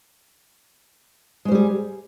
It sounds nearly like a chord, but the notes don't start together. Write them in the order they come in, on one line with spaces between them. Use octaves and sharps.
G#3 C5 G3 G#4